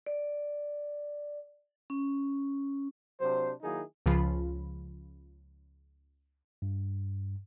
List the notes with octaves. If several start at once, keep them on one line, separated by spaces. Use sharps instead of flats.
D5
C#4
C3 F#3 D4 C5
D#3 F#3 A#3 D#4 E4 G#4
C#2 C#3 F3 F4 B5
G2